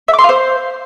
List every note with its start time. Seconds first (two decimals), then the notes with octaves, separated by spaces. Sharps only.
0.08 E5
0.13 D6
0.19 C6
0.24 F5
0.29 C5